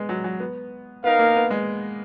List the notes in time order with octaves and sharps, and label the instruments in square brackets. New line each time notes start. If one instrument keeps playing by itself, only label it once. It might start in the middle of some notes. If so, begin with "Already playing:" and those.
Already playing: [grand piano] G#3 B3
F#3
F#3
B3
[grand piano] B3 [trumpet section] D#4 A#4 F5
[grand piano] A#3
B3
G#3